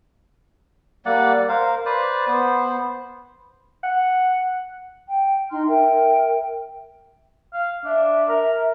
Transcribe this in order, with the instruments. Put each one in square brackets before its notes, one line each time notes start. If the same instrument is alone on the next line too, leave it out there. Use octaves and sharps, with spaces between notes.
[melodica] G3 A#3 D5 F#5
A#4 C5 F5
B4 C5 D5
B3 C5
[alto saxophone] F#5
[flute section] G5
D#4 C6 F6
A#4 E5 G5
[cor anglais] F5
[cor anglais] D4 [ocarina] E5
[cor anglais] A#4